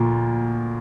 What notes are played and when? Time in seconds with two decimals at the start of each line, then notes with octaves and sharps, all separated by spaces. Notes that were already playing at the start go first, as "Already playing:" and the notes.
Already playing: D2 A#2 F3 A#3